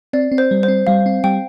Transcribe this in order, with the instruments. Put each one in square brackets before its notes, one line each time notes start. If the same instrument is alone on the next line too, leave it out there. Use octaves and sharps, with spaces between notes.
[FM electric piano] C4 [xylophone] D5
[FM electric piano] C4
[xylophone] C5
[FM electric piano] G3
[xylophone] C5
[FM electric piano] C4
[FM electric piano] G3 [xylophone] F5
[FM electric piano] C4
[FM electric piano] G3 [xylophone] G5